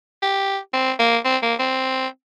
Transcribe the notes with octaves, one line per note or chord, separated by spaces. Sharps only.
G4
C4
A#3
C4
A#3
C4